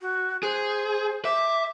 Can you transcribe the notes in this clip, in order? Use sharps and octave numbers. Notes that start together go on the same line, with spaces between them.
F#4
G#4 C5
E5 D6